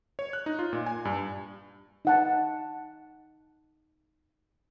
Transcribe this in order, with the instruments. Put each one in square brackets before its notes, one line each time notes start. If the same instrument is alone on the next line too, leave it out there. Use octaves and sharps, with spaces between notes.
[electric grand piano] C#5
F#6
D#4
F4
A#2
G#5
G2
[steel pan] D#4 F#5 A5